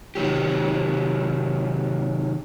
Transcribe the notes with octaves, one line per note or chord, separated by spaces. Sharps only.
C3 D#3 F#3 G4